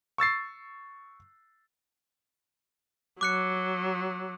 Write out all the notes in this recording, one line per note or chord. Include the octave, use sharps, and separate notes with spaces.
C#6 E6 A6 C7
F#3 D6 F#6 C#7